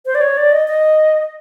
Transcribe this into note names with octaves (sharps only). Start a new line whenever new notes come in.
C5
D5
C#5
D5
D#5
D#5